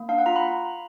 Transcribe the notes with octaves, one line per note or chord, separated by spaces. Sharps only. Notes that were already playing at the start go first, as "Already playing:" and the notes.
Already playing: A#3
D4 F5
F#5
F4 A#5
B5